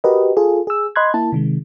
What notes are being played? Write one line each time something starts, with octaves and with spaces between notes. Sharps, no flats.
F#4 G4 A#4 B4 D#5
F4 G#4 A4
G#4 E6
D#5 B5 C6 F#6 G#6
A#3 E4 A5
C3 D#3 G#3